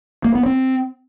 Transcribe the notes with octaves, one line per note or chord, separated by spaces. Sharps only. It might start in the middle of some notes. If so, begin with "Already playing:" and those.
A#3
B3
C4